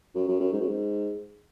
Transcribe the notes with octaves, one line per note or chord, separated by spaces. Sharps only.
F#2
F#2
F#2
G#2
F#2
G#2